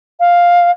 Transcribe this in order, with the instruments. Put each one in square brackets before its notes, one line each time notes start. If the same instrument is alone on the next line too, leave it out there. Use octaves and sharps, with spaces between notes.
[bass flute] F5